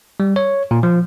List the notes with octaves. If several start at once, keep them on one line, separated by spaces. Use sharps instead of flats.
G3
C#5
A#2
F3